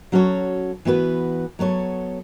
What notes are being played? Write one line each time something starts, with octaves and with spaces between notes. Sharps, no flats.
F#3 C#4 F#4 A4 C#5
E3 B3 F#4 B4
F#3 B3 A4 C#5